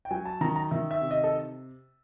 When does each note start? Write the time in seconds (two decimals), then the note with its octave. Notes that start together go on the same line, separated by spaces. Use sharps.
0.05 G5
0.11 F#3 G#5
0.25 A5
0.41 D#3 A#5
0.56 A#5
0.71 D#3 E5
0.91 E5
1.01 C3
1.11 D#5
1.24 A4